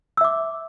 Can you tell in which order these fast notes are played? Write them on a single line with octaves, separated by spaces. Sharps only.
E6 E5 D6